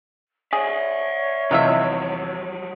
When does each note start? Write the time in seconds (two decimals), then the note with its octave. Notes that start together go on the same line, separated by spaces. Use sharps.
0.53 G#4 C#5 D5 E5
1.51 E2 C3 F3 F#3 D#4 F4 E5